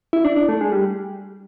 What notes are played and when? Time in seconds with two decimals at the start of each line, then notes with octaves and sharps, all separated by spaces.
0.13 E4
0.25 D4
0.36 D4
0.49 A3
0.61 G#3
0.72 G3